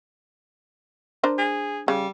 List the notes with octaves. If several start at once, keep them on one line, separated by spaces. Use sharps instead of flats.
D4 A#4 C5
G#4
C#3 G3